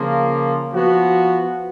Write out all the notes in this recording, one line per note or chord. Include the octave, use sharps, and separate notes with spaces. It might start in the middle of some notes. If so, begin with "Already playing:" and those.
Already playing: C#3 F3 A#3
F3 B3 F#4